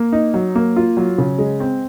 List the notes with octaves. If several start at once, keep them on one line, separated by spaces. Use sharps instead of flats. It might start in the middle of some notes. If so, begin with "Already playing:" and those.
Already playing: A#3
D#4
F#3
A#3
F4
F#3
C#3
G#3
C4